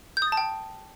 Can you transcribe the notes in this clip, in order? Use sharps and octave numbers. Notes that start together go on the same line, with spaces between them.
G6
D#6
A6
A5
G5